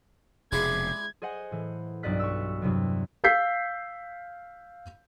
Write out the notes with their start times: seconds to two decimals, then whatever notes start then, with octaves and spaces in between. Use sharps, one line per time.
0.52 F1 B2 G#3 E4 D5 G#6
1.22 G#4 C5 D#5 F#5 G#5
1.51 A2 E3
2.03 B1 G2 D5 D#5 F#6 B6
2.19 C#6 E6
2.62 E2 G2 C3 F#3
3.24 F5 E6 G6 B6 C7